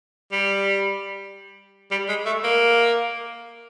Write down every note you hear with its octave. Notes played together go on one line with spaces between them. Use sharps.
G3
G3
G#3
A3
A#3